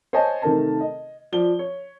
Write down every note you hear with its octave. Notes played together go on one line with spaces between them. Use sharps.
C5 C#5 D#5 G#5 A5
C3 D#3 A3 A#4 A5
D#5
F3 D5 G7
C#5